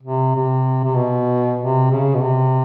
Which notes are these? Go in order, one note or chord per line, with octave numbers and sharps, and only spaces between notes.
C3
C3
C3
B2
C3
C#3
B2
C3